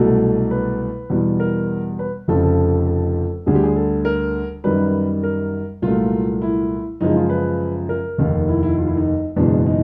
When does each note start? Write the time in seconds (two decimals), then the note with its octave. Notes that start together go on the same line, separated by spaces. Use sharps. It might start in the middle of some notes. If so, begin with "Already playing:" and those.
Already playing: C2 B2 F#3 A3 A4
0.51 B4
1.10 E2 B2 G3
1.40 A#4
1.99 B4
2.28 F1 F2 C#3 F3 A4
2.43 A4
2.87 A4
3.46 D2 D3 G3 G#4
3.55 G4
3.63 G#4
3.76 A4
4.05 A#4
4.64 F#2 D#3 G3 B4
5.23 A#4
5.82 C2 A#2 F#3 A3 F4
6.42 E4
7.01 F#2 C#3 F3 G#3 D#4
7.15 F4
7.30 B4
7.89 A#4
8.18 F1 D#2 D#3
8.48 E4
8.63 E4
8.78 F4
8.87 E4
8.97 D#4
9.36 F#1 E2 B2 G#3 D4
9.66 D#4